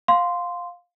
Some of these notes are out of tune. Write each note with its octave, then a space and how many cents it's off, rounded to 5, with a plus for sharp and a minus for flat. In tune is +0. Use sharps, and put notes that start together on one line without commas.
F5 +15 C6 -10